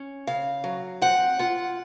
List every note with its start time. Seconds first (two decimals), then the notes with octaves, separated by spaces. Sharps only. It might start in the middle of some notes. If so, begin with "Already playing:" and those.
Already playing: C#4
0.27 C#3 F5
0.64 F#3
1.02 C4 F#5
1.39 F4 F#5